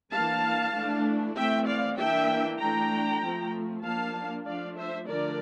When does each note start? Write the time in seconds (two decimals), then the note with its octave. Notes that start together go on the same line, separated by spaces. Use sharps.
0.12 E3 A#3 D4 F5 A5
0.75 E3 A3 D4
1.36 E3 A3 C4 E5 G5
1.67 D5 F5
1.98 E3 A#3 D4 E5 G5
2.60 E3 A3 D4 G5 A#5
3.22 F3 A3 C4
3.84 F3 A#3 D4 F5 A5
4.46 F3 A3 D4 D5 F5
4.77 C5 E5
5.08 D3 F3 A3 D4 A#4 D5